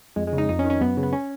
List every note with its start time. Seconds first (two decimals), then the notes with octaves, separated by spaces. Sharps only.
0.16 F2 G#3
0.27 G#3
0.33 C#3
0.38 D#4
0.49 F2 D#4
0.59 C#4
0.65 D#3
0.70 C#4
0.81 F#2 B3
0.97 C#3
1.03 B3
1.13 C#4